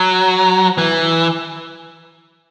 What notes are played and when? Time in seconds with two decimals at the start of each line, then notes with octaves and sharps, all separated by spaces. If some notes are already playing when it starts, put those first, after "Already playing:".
Already playing: F#3
0.78 E3